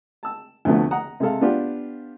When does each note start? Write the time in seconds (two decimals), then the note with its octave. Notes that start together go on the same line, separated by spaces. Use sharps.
0.23 A5 E6
0.65 D2 C3 F3 A3 B3
0.91 F#5 A#5 D#6
1.20 C3 G#3 G#4 A4 F5
1.41 B3 D4 F4 G4